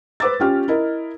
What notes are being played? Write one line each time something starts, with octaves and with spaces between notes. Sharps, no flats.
B4 C5 D6 E6 A6
C#4 F4 G4 F6
E4 A#4 D#5